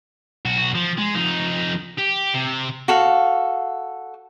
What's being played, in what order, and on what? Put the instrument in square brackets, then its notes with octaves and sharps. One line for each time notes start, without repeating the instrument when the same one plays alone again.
[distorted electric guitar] B1 F#4
F3
G#3
F2 D#4
G4
C3
[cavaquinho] F#4 A4 F5